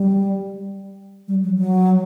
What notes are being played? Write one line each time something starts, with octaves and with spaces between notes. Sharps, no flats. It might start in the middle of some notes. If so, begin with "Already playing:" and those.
Already playing: G3
G3
F#3
F#3